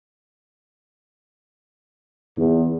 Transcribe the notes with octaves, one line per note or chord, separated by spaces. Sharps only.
E2